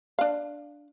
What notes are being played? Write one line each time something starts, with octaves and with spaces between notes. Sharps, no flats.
D4 F5